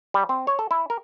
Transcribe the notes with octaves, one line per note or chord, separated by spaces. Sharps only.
G3
C4
C#5
A4
E4
A#4